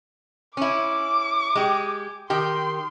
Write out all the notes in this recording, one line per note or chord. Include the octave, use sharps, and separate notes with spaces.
C#4 E4 D6
G#3 G4
D#3 G4 C6